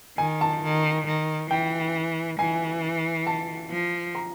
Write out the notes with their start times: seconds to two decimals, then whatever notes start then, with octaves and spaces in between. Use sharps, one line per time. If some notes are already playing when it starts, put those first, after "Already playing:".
0.18 D#3 G#5
0.41 A5
0.63 D#3
1.07 D#3
1.51 E3 G5
2.39 E3 G#5
3.27 A5
3.71 F3
4.15 A#5